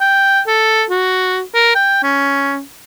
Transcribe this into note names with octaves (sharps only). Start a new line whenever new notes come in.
G5
A4
F#4
A#4
G5
C#4